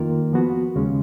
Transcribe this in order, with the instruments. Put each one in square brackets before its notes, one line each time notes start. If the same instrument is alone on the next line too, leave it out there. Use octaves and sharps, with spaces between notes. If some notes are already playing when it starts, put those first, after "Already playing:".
Already playing: [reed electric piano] F2 D#3 A#3 F4 A#4
F3 B3 F#4
D#2 C#3 G#3 C#4